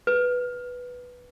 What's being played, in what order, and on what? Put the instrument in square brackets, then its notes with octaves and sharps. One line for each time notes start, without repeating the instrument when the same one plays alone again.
[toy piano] B4